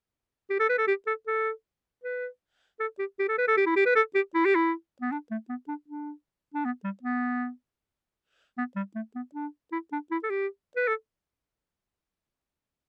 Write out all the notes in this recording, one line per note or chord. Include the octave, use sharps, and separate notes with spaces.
G4
A4
B4
A4
G4
A4
A4
B4
A4
G4
G4
A4
B4
A4
G4
E4
G4
B4
A4
G4
E4
G4
E4
B3
D4
A3
B3
D4
D4
D4
B3
G3
B3
B3
G3
A3
B3
D4
E4
D4
E4
A4
G4
B4
A4